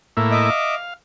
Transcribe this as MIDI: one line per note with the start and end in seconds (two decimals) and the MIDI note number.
0.17 0.50 45
0.17 0.50 58
0.17 0.50 64
0.31 0.75 75
0.31 0.75 76
0.31 0.75 86
0.50 0.94 77